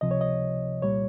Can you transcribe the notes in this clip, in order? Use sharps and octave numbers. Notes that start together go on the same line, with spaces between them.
C#2 C3 F3 D#5
C#5
D#5
C2 A#2 G3 C#5